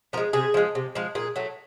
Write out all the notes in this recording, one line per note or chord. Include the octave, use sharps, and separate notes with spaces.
F3 G#3 A#4
C3 G#4
F3 G#3
C3
F3 G#3
A#2 G#4
F#3 A3